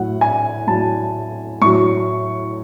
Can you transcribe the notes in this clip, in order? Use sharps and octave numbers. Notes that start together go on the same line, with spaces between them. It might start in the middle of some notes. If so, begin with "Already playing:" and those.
Already playing: A2 F#3 F#5
G#5
A2 F#3 A5
A2 F#3 C#6